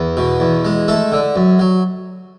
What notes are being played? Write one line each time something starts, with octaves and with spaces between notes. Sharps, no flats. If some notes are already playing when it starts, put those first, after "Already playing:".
Already playing: E2
B2
E2
G#3
A3 A4
D3
F#2
F#3